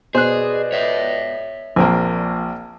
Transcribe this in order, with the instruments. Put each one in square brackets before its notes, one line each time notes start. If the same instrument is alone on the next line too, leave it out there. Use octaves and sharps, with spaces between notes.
[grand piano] B2 [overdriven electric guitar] G#4 [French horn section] B4 D5 D#5 [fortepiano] C5 F#6
[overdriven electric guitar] C#5 E5
[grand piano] A#1 [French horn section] A#2 [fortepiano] A#3 C4 G#5